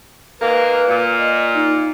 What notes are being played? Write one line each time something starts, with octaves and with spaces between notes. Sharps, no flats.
G#2 A#3 B4
A#2
D#5
D#4